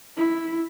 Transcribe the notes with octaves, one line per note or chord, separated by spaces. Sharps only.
E4